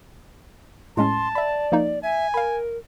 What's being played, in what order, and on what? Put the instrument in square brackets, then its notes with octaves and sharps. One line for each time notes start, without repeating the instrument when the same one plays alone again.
[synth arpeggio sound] A2 G#3 C#4 [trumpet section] A5 [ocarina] C6
[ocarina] D5 [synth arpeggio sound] E5 B5
[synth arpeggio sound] F3 A#3 D#4
[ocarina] E5 [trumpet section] G#5
[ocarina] A#4 [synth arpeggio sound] F5 B5